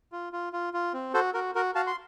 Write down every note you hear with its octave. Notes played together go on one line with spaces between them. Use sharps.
F4
F4
F4
F4
C4
F#4 A4 C5
F#4 A#4
F#4 A#4
F#4 F5 A5
C6